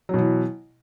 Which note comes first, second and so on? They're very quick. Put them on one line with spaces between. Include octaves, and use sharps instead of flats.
F#3 B2 E3